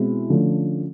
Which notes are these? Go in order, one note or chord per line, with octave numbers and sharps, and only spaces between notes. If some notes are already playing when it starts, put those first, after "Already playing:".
Already playing: B2 G#3 C4 E4
D3 F3 A3 C#4